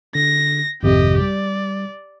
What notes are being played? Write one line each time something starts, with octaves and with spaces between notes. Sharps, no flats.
D3 A#6
G#1 F2 C3 G4 D#5
G3 D5